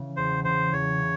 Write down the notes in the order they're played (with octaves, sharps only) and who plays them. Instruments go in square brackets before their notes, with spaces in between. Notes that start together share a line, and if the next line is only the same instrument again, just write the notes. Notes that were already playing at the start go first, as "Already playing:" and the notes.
Already playing: [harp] C#3 E3
[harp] E2 [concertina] C5
[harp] C#3 E3 [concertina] C5
[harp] E2 [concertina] C#5
[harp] C#3